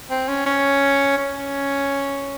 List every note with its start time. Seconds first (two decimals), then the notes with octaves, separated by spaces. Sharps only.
0.10 C4
0.28 C#4
0.46 C#4
1.18 C#4